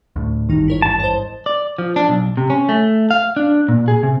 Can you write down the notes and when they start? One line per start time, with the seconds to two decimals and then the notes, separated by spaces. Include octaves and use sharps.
0.16 D2 A2
0.49 G#1 E2 G2 D#3 D#4
0.68 E4 A#4 C#5
0.82 A5
1.00 C5 D#5
1.46 D5
1.78 F3
1.96 D4
2.09 B1
2.37 C3
2.50 C#4
2.69 A3
3.11 F5
3.37 D4
3.68 A#2
3.88 G#4
4.03 C3